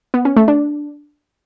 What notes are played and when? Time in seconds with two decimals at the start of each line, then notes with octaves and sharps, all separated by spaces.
0.14 B3
0.25 C#4
0.37 A3
0.48 D4